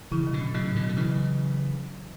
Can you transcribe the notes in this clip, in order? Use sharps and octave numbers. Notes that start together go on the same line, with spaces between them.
C#3 E3 E4
F#3
B2 D3
C#4
A2 C#3 F#3
C#4
B2 D3
F#3
D3
C#3 E3 E4
F#3